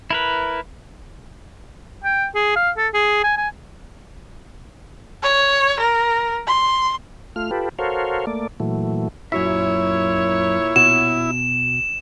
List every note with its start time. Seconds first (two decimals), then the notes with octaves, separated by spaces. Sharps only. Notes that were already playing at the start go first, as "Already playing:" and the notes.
0.11 E4 A#4 B4
2.04 G5
2.35 G#4
2.56 F5
2.77 A4
2.94 G#4
3.24 G#5
3.37 G#5
5.23 C#5
5.79 A#4
6.47 C6
7.36 A3 F4 F6
7.51 F4 G4 A4 B4
7.79 F#4 A4 A#4 C5 C#5 F5
8.27 A3 A#3 D5
8.60 A#2 E3 F#3 A3
9.32 F#2 A#2 E4 F#4 C#5 E5
10.76 B2 F#4 E7